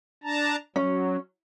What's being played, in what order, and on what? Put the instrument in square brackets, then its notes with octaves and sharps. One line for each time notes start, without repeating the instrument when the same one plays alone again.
[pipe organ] D4 A5 A#5
[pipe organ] F#3 [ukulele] C#4